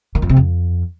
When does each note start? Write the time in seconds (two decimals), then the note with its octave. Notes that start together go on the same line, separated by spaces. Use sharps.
0.15 D#3
0.22 F2
0.29 C3
0.37 F2